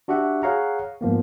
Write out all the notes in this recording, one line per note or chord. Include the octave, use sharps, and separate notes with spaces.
D4 F#4 G4 E5 F#5
G#4 C#5 F5 F#5 A#5
G#2 F3 A#3 B3